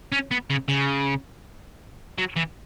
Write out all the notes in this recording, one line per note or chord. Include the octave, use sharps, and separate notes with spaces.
C#4
B3
C#3
C#3
F#3
E3